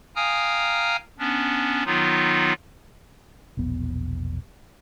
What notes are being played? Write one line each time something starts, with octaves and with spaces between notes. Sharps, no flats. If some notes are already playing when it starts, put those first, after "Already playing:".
F5 G5 G#5 A#5 D#6 F6
B3 C#4 D4
D#3 F#3 B3 D#4 F4
E1 A#1 B3